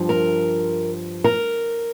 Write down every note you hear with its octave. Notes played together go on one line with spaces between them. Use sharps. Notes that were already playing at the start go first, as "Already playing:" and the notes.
Already playing: G2 F3
A#4
A#4